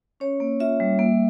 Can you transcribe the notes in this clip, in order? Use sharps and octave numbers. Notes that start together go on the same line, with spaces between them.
C#4 C#5
A#3
F4 E5
G3
A#3